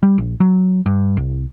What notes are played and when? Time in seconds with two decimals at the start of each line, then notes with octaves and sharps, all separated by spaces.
0.03 G3
0.18 A#1
0.40 F#3
0.86 G2
1.17 C2